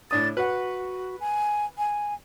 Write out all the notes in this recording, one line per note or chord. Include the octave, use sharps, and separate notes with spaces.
A2 D4 D#6 A6
F#4 B4 F#5
G#5
G#5